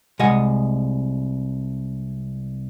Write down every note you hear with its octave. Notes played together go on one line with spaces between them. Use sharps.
C2 G#3 D#5 F#5 G#5